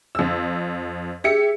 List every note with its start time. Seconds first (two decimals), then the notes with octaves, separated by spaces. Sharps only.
0.15 F2 E6
1.24 G4 G#4 E5 C#7